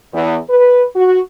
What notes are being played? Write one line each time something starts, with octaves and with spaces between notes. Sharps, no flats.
E2
B4
F#4